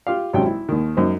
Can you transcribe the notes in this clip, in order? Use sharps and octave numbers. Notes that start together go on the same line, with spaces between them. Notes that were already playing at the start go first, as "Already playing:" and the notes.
F4 G4 F5
G#1 F#2 C3 F#3 C#4 G5
E4
D#2 D#3
F#2 D#4 C5